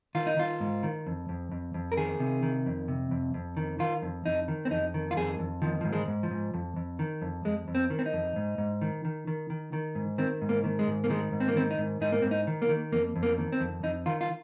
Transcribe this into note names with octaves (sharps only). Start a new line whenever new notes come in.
D#3 F4
D#4
D#3 F4
G#2
D#3
F2
F2
F2
F2
A#4
D#3 G#4
C3
D#3
F2
C3
F2
F2
D#3
D#3 F4
F2
F2 D#4
D#3
C4
F2 D#4
D#3
F4
F2 G#4
F2
D#3 F3
G#2 F3
G#3
G#2
F3
G#2
F2
F2
D#3
F2
F2 G#3
F2
C4
D#3
C4
D#4
F2
G#2
G#2
D#3
D#3
D#3
D#3
D#3
G#2
D#3 C4
G#2
A#3
D#3
G#3
G#2
A#3
D#3 G#3
G#2
C4
A#3
D#3 C4
D#4
G#2
G#2 D#4
A#3
G#2 C4
D#4
D#3
A#3
D#3
F2 A#3
F2
A#3
D#3
C4
F2
F2 D#4
D#3 F4
F4